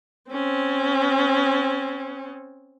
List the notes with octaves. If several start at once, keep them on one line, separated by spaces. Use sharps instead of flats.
C4 C#4